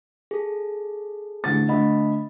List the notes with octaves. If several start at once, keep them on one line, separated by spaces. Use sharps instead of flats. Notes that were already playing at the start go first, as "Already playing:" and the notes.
G#4 A4
A1 D3 A6
D3 A3 D#5 B5